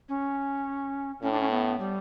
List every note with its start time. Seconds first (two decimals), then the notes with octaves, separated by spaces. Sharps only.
0.09 C#4
1.23 A2 C#4
1.31 D4
1.40 C#4
1.51 B3
1.79 G3